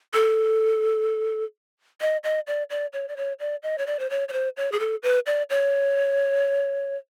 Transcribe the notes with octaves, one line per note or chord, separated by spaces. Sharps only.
A4
D#5
D#5
D5
D5
C#5
D5
C#5
D5
D#5
C#5
D5
C5
C#5
C#5
C5
C#5
G#4
A4
B4
D5
C#5